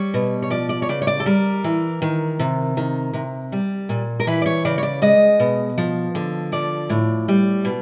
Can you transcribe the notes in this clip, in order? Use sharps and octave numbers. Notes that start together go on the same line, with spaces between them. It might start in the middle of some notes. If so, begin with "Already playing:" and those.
Already playing: G3 C#5
B2
C#5
F3 D5
D5
C#5
C#3 D5
C#5
D5
A4
G3 A#4
E3
D#3
C3
D#3
C3
G3
A#2
A#4
E3 B4
D5
C#5
C#3 D5
C#5
D5
G#3 D#5
B2
F3
D3
F3 D5
A2
G3
B2